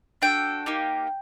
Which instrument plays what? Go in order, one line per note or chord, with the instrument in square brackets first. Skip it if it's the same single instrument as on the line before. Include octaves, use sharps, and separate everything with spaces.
[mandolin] D4 F#4 A4 G5
A#3 D#4 G4